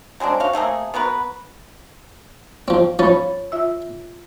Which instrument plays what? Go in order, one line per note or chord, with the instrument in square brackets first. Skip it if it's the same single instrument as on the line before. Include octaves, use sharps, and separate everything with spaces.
[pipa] F#3 G#3 C4 D4
F#4 C#5 F5
C3 A3 A#3 G#4
B3 F#4 A#4 B4
[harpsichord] F3 C4
[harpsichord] F3 C#4 [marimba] C#5 B5 A6
[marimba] F4 E5 E6